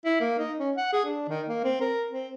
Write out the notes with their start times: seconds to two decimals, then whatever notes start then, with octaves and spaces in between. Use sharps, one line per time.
0.05 E4
0.20 A#3
0.39 D#4
0.60 C#4
0.77 F#5
0.93 G#4
1.05 D4
1.29 D#3
1.48 A#3
1.64 C4
1.81 A#4
2.11 C4